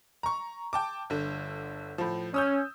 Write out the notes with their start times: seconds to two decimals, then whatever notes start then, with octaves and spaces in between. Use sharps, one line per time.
0.23 A#5 C#6
0.73 G5 A5 D6
1.10 G1 D3
1.98 A2 F3
2.34 C#4 D#6 E6 G6